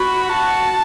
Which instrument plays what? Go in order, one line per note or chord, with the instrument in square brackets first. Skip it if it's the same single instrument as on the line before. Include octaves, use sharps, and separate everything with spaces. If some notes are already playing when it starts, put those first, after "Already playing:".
Already playing: [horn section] F#4 [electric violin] B5
[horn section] F#4 [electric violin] A5